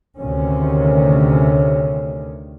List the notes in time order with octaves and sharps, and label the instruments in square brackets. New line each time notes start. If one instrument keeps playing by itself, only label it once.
[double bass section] D2 C3 D#3 C#4